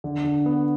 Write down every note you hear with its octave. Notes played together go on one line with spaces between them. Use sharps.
D3
D3
B3